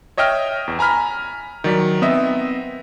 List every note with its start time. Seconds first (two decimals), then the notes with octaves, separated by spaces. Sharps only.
0.17 C#5 D#5 E5 G5 F6
0.68 E2
0.79 G#5 A#5 B5 F6 B6
1.64 D#3 F#3 D5 B6
2.02 B3 C4 D#5 E5